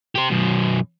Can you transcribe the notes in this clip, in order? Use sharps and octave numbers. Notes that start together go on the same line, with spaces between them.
G4 C5
F#2 B2